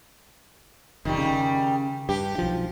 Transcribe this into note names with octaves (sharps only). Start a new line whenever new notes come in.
F1 D#3 G3
C#3
G2 G4
B1 F3